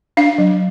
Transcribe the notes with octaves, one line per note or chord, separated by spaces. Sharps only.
D4 F5
F#3